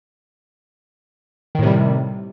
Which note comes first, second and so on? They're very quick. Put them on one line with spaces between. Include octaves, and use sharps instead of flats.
D#3 A2 C3 G3